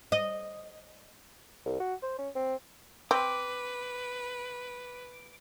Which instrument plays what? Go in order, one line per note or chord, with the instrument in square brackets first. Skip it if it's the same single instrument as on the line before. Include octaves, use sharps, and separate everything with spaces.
[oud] D#5
[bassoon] C2
F#4
C5
C#4
C4
[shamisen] C4 [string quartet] B4 [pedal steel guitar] D6